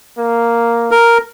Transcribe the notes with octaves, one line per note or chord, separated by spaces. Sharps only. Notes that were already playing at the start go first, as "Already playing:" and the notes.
A#3
A#4